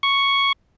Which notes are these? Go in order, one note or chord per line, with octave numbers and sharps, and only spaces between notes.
C#6